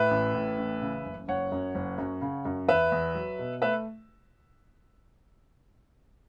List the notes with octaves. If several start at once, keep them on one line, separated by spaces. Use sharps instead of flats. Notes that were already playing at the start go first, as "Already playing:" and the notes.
Already playing: A2 B4 E5
A1
A2
A1
C#3
F#1
F#1 C#5 F#5
F#2
F#1
F#2
C#3
F#2
E2 B4 E5
E2
F#3
B2
A3 B4 E5